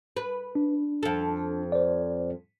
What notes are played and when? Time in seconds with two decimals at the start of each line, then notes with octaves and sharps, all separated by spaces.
0.17 B4
0.55 D4
1.03 F2 A4
1.72 C5 D5